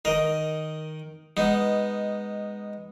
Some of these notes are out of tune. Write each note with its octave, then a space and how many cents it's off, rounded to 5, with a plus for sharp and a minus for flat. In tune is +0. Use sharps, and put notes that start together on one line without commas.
D#3 +0 A#4 +15 D#5 +0
G#3 -10 B3 +0 D#4 +0